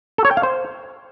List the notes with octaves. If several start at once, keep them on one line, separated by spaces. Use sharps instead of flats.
A4
C#5
G5
F5
C5